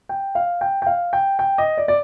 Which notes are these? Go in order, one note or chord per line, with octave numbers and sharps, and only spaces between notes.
G5
F5
G5
G5
F5
G5
G5
D#5
D5
D5